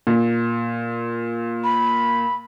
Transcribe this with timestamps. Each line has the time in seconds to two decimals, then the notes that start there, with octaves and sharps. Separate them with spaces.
0.07 A#2
1.64 B5